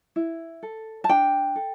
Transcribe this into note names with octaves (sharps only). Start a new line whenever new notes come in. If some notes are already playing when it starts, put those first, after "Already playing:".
E4
A4
A5
D4 G5
A4